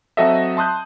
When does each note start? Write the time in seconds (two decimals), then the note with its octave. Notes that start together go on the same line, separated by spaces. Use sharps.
0.17 F#3 C4 F#4 A4 D#5 E5
0.57 A5 C6 D#6 F#6 G6